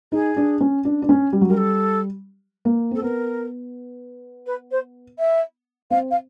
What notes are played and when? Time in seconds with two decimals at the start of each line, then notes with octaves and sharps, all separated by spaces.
0.12 D#4 G#4
0.37 D4
0.61 C#4
0.85 D4
1.02 D4
1.09 C#4
1.33 G3
1.41 F#3
1.48 G3 A#4
1.57 A4
2.65 A#3
2.91 C4 A4
3.02 B3 A#4
4.46 B4
4.71 C5
5.18 E5
5.90 C4 F5
6.10 F5